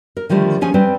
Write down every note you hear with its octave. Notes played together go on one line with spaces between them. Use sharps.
A#4
D3 D#3 F3 G3 A3
F3 C#4 G#4 G#5
G3 C4 B4